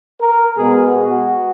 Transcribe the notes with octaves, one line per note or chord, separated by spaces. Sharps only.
A#4
B2 G#3 B3 G#4
F#4